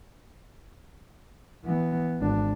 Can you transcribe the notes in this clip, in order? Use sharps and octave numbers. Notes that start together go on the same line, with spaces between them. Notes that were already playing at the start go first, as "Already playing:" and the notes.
E3 B3
G#1 D4